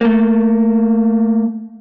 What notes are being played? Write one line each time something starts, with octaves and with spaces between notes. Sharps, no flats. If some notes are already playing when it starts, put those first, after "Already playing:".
A3 A#3